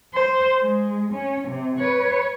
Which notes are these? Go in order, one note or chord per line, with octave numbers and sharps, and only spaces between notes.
C5
G#3
C#4
C3
B4 C#5